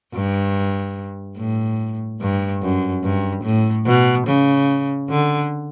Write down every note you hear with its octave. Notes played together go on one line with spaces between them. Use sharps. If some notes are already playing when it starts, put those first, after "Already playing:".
G2
A2
G2
F#2
G2
A2
B2
C#3
D3